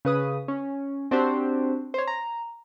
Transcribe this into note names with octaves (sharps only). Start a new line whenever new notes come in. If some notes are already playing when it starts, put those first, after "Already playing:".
C#3 B4 D#6
C#4
C4 D4 F#4 G4 C5
C5 C#5
A#5